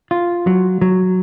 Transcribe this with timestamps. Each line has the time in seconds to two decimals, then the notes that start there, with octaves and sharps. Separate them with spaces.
0.11 F4
0.47 F#3
0.81 F#3